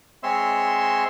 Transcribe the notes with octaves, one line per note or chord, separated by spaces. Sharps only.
G#3 C4 C#5 E5 C6